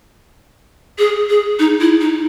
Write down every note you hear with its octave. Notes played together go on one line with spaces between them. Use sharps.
G#4
G#4
D#4
E4
D#4